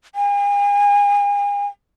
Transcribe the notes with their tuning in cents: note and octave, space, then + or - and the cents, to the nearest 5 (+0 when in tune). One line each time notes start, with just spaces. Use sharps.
G#5 -40